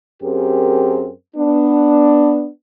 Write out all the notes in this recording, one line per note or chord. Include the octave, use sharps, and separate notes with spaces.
F#2 C4 G4 G#4 A#4
B3 D4